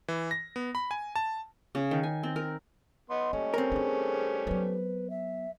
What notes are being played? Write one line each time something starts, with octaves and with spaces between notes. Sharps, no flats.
E3
A#6
B3
B5
G#5
A5
C#3
D#3
G#5
C4
A#4
B3 D#5 C6
G3 A3 A#3 C#4
C4 A#4
D4 D#4 G#4
F#3 B3 B4
E5